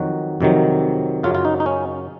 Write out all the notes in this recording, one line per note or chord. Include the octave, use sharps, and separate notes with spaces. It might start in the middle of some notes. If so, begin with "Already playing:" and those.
Already playing: F2 D#3 F#3 F#4
F2 C3 D#3 F#3
F#2 C#3 F#3 F4
F4
D#4
D#4
C#4